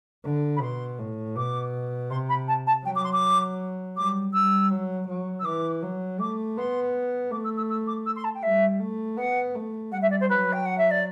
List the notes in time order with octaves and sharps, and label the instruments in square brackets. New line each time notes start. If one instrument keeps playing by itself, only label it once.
[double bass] D3
[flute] B5
[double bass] B2 [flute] C6
[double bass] A2
[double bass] B2 [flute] D6
[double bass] C3 [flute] C6
[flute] B5
A5
A5
[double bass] F#3 [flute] G5
[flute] D6
C6
D6
[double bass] G3 [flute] D6
[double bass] G3 [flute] E6
[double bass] F#3
F#3
[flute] E6
[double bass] E3 [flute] D6
[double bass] F#3
[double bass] A3 [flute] D6
[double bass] B3 [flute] C6
[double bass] A3 [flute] D6
[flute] E6
E6
E6
D6
E6
C6
A5
G5
[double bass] G3 [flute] E5
[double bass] A3
[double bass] B3 [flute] F#5
[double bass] A3
[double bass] G3 [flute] F#5
[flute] E5
D5
C5
[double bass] F#3 [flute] B4
[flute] G5
F#5
E5
D5